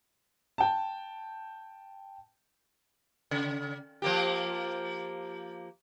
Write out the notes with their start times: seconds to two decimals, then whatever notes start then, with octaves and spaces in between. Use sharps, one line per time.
0.58 G5 A5
3.31 C#3
4.02 F3 A#3 G4